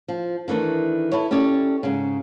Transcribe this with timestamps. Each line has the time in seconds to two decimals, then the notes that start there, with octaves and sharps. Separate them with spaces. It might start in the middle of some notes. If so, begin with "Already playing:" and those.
0.08 F3
0.48 D#3 E3 A3 D4
1.12 E4 A4 B4 C#5
1.31 C#4 G4 A4 C#5 D5
1.83 G#2 C#3